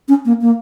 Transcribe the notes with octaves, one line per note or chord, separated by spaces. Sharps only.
C#4
A#3
A#3